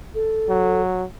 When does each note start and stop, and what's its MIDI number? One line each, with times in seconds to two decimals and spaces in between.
0.15 0.81 69
0.49 1.04 54